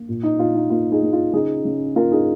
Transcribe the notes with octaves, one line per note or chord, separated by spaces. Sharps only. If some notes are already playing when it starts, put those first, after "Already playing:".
Already playing: A#3
A#2
D#4
A#2 F4
D#4
A#3 F4
D#4 G#4
A#3
F4
C#3 D#4 G#4
C#3
A#3 F4 A#4
D#4 G#4